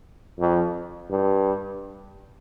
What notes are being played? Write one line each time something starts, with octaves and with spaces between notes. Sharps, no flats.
F2
G2